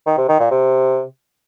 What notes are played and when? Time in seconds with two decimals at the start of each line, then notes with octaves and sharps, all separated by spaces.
0.06 D#3
0.18 C3
0.29 D#3
0.40 A#2
0.51 C3